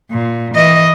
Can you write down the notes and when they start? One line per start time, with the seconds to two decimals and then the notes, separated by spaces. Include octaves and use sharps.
0.11 A#2
0.54 E3 D#5